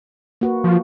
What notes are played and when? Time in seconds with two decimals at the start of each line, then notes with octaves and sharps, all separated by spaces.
0.41 A#3 F#4 B4
0.64 F3